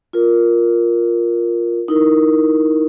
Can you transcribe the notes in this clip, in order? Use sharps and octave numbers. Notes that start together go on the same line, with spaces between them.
F4 A#4
D#4 E4 A#4